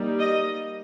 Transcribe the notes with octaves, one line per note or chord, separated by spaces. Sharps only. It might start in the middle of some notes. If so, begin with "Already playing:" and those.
Already playing: G3 A#3 D#4
D#5